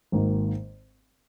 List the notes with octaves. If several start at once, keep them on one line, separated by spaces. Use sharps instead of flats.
G#1 G#2 D#3 A#3